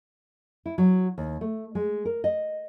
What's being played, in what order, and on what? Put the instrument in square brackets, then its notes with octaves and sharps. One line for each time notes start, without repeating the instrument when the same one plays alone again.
[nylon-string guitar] E4
F#3
D#2
A3
G#3
A#4
D#5